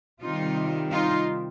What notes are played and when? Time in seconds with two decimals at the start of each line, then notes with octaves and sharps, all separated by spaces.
0.22 C3 D#3 G3 D#4 F4
0.90 D#4 F4